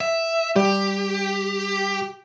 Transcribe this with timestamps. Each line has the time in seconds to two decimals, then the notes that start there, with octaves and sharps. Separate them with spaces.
0.01 E5
0.56 G3 G4